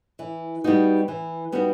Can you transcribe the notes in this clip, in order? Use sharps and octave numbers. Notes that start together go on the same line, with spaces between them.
E3
G3 B3 D#4 F#4
E3
G3 B3 D#4 F#4